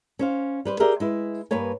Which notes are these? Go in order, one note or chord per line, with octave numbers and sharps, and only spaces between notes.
C#4 C5 F5
G3 B4 C5
G4 G#4 A#4 D5 E5
G#3 E4 B4
G2 A#3 B4 C#5 G#5